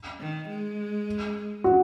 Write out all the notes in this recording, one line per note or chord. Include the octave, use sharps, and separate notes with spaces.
D#3
G#3
F#4